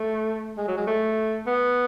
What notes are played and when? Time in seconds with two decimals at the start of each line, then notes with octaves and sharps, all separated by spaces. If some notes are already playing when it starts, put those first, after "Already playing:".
Already playing: A3
0.58 G#3
0.68 F#3
0.77 G#3
0.87 A3
1.47 B3